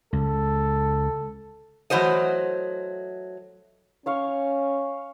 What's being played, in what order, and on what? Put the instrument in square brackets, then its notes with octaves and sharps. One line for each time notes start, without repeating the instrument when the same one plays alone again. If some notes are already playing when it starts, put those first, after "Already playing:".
[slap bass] C#2 [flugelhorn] A4
[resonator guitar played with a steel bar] E3 F#3 A3 C5 D#5
[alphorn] C#4 [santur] C#5 F5 C#6